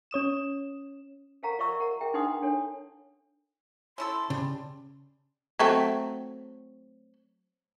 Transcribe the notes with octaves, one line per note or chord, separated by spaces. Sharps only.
C#4 C#5 D#6 E7
A4 A#4 F5 F#5 A#5 C#6
F4 D5 E5 C#6 E6
A#4 F#5 A#5
G#4 E5 G5
D4 D#4 B4 F#5 C6 D#6
D4 A4 C#5
C#4 E4 A4 C6
C#3 G3 D4
F#3 A3 C4